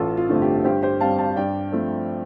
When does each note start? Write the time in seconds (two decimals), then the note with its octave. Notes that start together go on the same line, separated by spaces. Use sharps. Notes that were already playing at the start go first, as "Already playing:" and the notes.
Already playing: A1 F4 A4
0.17 F4
0.29 G2 D3 A3 C4
0.42 G4
0.64 G2 G4 C5
0.82 G4 C5
1.01 G3 C4 F5 A5
1.19 F5 A5
1.36 G2 D5 G5
1.72 F3 A3 C4